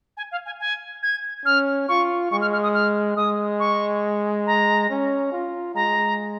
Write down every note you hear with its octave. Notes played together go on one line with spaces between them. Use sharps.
G#5
F5
G#5
G#5
G#6
C#4 F6
F4 C#6
G#3 C#6
F6
F6
D#6
F6
G#3 D#6
C#6
A#5
C#4
F4
G#3 A#5